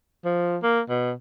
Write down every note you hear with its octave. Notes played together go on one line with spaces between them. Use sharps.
F3
A#3
B2